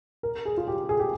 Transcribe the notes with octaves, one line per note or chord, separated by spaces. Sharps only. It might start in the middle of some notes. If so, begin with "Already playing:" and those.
A#4
G#4
F4
G4
G#4
G4